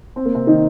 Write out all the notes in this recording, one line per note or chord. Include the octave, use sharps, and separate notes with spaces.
C4
A#3
C3 C4
D#3 D#4